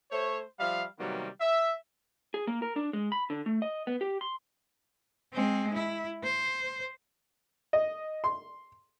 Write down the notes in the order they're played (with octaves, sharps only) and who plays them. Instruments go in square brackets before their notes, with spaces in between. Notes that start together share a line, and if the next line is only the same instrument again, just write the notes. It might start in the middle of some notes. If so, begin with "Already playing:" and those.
[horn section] A3 C5 C#5
F3 G3 E5 F5
C3 D#3 F#3 G3 A#3 B3
E5
[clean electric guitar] G#4
A#3
A#4
D4
G#3
B5
D3
A3
D#5
B3
G4
C6
[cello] G#3 C4
E4
C5
[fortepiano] D#5
C6